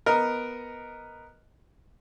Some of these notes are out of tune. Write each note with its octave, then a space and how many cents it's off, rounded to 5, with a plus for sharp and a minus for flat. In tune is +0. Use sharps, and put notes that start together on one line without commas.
B3 +0 A#4 +0 D#5 +0